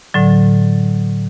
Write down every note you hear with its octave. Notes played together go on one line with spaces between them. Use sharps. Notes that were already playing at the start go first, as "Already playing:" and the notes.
A2 D3 F#3